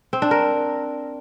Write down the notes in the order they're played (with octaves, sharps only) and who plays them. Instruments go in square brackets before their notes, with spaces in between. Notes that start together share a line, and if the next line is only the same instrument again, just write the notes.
[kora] C4
D4
A#4